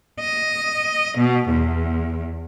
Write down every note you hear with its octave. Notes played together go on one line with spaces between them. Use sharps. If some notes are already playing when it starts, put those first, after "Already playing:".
D#5
B2
E2